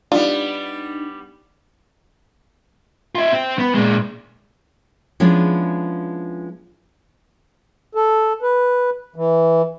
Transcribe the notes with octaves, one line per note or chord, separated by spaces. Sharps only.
G3 B3 D4 D#4 F4 D5
F4 E5
C4
B3
A#2 G#3
F3 G#3 B3 C#4 D4 E4
A4
B4
E3